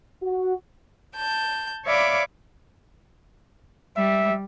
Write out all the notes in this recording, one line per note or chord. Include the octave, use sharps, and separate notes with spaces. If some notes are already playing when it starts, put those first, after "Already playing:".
F#4
A5 G6
C#5 D5 E5 F5 B5 D6
G3 E5